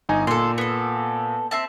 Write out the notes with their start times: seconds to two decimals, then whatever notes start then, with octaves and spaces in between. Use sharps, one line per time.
0.09 G1 D#4 G#5
0.27 A#2 A4 C6
0.58 B3 A4
1.51 C4 E5 A5